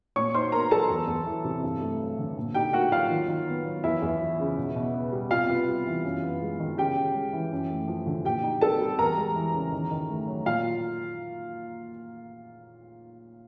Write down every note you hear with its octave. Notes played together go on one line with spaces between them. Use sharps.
A#2 C#5 C#6
D#4 C5 C6
B3 A#4 A#5
F#3 A4 A5
E2
E2
E3
C3
G2
A3
F#3
D3
A#2
D#4 G4 G5
A#3 F#4 F#5
F#3 F4 F5
D#3
D#3
B3
F#3
E2 E4 E5
E2
F3
C#3
B2
B2
B3
G3
C3 F4 F5
B3
G3
E3
F#2
B3
G#3
D#3
C#3 G4 G5
C#3
G#3
E3
F#2
A3
F3
D3
A#2 G4 G5
D#4
C4 A4 A5
G3
E2 A#4 A#5
G#3
E3
C#3
D#3
D#3
A3
F#3
A#2 F4 F5